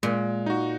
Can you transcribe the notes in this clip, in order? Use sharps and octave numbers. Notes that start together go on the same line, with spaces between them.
A#2 G#3
D#4 F#4